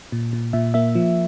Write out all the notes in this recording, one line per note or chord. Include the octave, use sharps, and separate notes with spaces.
A#2
A#2
A#2 E5
A#3 E5
F3